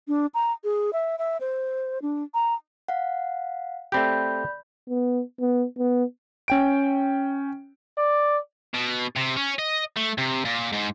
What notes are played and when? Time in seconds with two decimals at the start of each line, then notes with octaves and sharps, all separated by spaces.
0.08 D4
0.34 A#5
0.64 G#4
0.93 E5
1.18 E5
1.40 C5
2.02 D4
2.34 A#5
2.88 F5 F#5
3.92 A3 C4 G4 D5 B5 G6
4.89 B3
5.40 B3
5.78 B3
6.48 C#4 G5 D7
7.98 D5
8.74 B2
9.16 C3
9.37 C#4
9.59 D#5
9.97 A3
10.18 C3
10.45 A#2
10.73 G#2